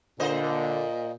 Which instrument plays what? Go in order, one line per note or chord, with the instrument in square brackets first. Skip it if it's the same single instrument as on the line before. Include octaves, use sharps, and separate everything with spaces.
[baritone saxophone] A#2 [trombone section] D3 [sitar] A#3 C5 D#5